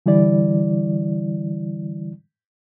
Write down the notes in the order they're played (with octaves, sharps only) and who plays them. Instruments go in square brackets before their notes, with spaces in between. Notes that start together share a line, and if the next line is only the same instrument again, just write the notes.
[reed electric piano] D3 E3 G3 E4 D5